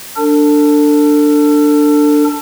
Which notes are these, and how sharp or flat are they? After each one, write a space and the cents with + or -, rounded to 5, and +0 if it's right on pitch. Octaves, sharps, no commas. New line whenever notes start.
D4 +0 A4 +35